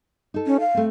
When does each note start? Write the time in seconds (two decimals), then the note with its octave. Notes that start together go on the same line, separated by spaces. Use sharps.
0.34 D#4 A4
0.46 C#4
0.60 F5
0.74 A3 C4